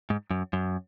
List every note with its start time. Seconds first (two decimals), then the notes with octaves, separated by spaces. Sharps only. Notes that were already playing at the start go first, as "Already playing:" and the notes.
0.10 G#2
0.31 F#2
0.53 F#2